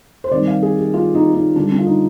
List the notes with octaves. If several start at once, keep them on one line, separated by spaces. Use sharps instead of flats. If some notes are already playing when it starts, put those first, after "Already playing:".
C5
C3 D#3 G3 D5
F5
G#4
G4
F4
D#4
D#4
D3 G3 D4
D4
F4
D#4